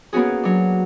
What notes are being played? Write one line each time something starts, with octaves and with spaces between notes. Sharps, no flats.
A#3 B3 C#4 F#4 G#4
F#3 D4